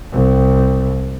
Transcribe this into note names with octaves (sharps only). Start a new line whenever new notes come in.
C2